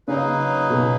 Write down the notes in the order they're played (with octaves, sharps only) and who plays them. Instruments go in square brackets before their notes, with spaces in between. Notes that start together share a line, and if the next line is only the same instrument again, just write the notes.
[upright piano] C#3 [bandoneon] F#3 A#3 D#4 G#4 B4
[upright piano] B2